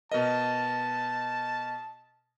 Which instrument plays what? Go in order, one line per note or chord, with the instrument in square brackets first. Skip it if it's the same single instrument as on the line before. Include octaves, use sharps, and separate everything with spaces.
[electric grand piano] B2 A#4 D#5 [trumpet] A5